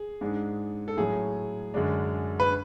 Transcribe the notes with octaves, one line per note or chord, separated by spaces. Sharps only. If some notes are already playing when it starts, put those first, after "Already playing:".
Already playing: G#4
G#2 G#3 D4
A4
A2 F#3 C#4 G#4
F#2 D3 G#3 D4
B4